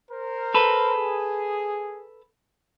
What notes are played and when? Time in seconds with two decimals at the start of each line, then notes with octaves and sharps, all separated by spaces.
0.11 A#4 C5
0.54 A4 B4
0.95 G#4